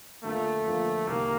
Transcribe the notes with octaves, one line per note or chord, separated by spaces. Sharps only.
F2 D3 F3 A3 A#3 F4
F2 D3 F3 A#3 F4
C2 C3 D#3 A#3